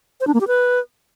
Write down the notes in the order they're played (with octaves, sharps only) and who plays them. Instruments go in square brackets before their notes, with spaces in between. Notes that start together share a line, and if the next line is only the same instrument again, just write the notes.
[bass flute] C5
D4
A#3
G4
B4